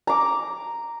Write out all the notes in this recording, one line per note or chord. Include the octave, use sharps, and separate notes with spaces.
A#5 D6